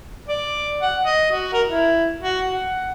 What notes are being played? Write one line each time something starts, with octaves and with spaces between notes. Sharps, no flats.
D5
F#5
D#5
F#4
A#4
E4
F#4
F#5